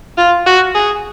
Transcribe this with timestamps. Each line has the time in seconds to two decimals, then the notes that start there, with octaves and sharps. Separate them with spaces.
0.18 F4
0.46 F#4
0.74 G#4